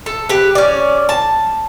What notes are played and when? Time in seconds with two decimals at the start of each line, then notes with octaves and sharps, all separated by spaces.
0.06 A4
0.29 G4 B4
0.55 C#4 D5
1.09 A5